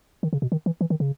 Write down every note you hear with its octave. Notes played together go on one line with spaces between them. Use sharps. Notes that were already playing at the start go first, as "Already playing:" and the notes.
D#3
C#3
B2
D#3
E3
E3
D#3
C#3